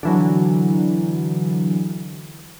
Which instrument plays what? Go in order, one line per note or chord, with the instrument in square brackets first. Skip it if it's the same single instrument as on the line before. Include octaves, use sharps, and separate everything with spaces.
[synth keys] D3 E3 F#3